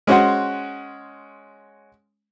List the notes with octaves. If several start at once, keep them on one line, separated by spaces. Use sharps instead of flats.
G#3 C#4 F#4 C5 F#5